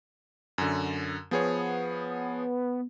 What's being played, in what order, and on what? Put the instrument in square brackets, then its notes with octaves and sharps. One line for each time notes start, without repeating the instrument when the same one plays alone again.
[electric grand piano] F#2 D3
[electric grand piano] F3 G#4 C#5 [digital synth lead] B3